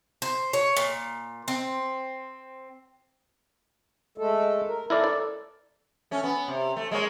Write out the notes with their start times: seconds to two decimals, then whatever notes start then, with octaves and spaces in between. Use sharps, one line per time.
0.22 C5
0.53 C#5
0.77 A#2
1.48 C4
4.18 G#3 A3 A4
4.68 A#4
4.90 E4 A4 A#4 D5
5.04 D5
6.11 A3 C#4
6.24 B3
6.48 C3
6.76 A3
6.91 G#3 A#3 C#5